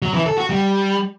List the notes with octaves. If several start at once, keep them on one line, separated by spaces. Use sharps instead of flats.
F#3
E3
A4
F#4
G3